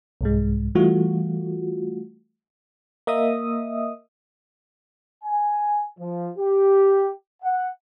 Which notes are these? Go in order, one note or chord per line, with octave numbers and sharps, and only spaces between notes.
C2 G#2 G#3
E3 G3 A3 F4 F#4
A#3 D#5 E5 D#6
G#5
F3
G4
F#5